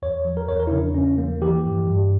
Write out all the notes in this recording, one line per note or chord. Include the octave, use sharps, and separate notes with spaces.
E2 C#5
F3
A#4
E2 C#5
A#4
E4
C#3 D4
E2 C#4
F3 A#3
E3 G4
G2
G2